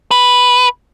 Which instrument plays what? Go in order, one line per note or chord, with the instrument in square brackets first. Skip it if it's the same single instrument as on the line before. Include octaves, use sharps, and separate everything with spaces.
[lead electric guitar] B4